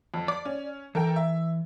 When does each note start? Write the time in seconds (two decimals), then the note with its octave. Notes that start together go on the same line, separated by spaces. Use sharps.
0.14 F2
0.28 D5 D6
0.45 C#4
0.95 E3 A4 A#4 G5
1.16 E5